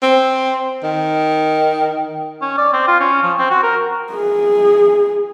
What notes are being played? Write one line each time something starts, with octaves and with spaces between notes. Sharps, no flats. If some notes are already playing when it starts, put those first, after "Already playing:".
C4
D#3
C#4
D5
C4
F4
C#4
F3
C4
F#4
A#4
G#4